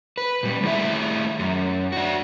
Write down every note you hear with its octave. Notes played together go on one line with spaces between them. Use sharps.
B4
A#2 G3
D#3 A3 E4 G#4 E5
F#2
D4 F#4